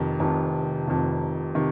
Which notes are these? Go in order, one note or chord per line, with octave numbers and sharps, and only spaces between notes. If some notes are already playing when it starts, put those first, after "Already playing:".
Already playing: F1 F2 C3 D#3
F1 F2 C3 D#3
F1 F2 C3 D#3
C3 D#3